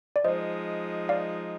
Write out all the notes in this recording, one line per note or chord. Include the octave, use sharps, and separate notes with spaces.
D5
F3 G#3 D#4 C5 D#5
D5 F5